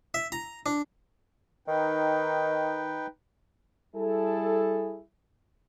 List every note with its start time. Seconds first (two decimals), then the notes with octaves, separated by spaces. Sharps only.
0.14 E5
0.32 A#5
0.66 D4
1.68 D#3 D#4 B4 G5
3.95 G3 E4 G#4 A4